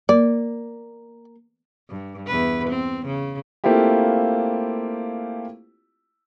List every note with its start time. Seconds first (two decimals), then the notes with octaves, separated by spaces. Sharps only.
0.09 A#3 D5
1.89 G2
2.27 E2 B4
2.69 C4
3.06 C#3
3.64 A3 A#3 C4 E4 F4 G4